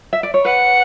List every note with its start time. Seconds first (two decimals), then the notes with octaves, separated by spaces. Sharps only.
0.13 E5
0.23 D5
0.34 C#5
0.45 B4 F#5